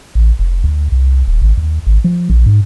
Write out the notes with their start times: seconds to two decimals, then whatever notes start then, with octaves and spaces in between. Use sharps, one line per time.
0.15 A1
0.39 F1
0.64 D2
0.92 C2
1.27 D#1
1.42 G#1
1.57 D#2
1.87 G#1
2.04 F3
2.30 A#1
2.46 G#2